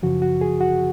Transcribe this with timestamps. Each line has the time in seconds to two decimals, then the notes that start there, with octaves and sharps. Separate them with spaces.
0.03 F#2 C#3 F3 F#4
0.22 F#4
0.41 G#4
0.61 F#4 F#5